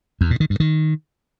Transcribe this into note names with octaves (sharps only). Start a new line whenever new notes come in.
E2
A#2
D#3
G2
D#3